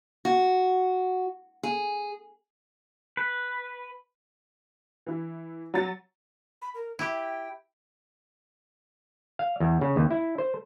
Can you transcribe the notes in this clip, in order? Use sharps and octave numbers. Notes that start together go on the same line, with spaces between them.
F#4
G#4
B4
E3 E4
F#3 A#5 A6 C#7
B5
A#4
E4 G4 G5
F5
E2
C#3
D#2
E4
C5